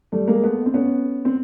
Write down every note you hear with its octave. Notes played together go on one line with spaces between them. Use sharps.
G3 A3
G#3 A#3
A3 B3
C4
B3 C#4
C4